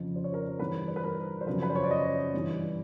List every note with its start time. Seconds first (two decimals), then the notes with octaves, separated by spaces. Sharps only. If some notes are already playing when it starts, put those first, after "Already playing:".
Already playing: F2 C#3 F3
0.16 C5
0.24 C#5
0.33 A#4 C5
0.59 G2 E3 B4
0.88 C5
0.96 B4
1.04 A#4
1.41 C5
1.46 F#2 C#3 F3 B4
1.62 B4
1.70 C5
1.75 C#5
1.83 D5
1.90 C#5 D#5
2.34 G2 E3